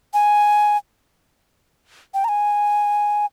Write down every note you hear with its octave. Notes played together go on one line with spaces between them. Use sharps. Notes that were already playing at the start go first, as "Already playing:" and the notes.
G#5
G5
A#5
G#5